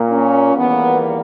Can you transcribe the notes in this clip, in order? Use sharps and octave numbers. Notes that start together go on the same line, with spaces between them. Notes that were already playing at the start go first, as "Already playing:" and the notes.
Already playing: A#2 A#3
C#4
E2 D#3 G3 A#3 B3